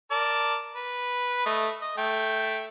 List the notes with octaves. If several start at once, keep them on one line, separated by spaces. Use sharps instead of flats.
A#4 D5 A5
B4
A3 D#5
D#5
A3 G5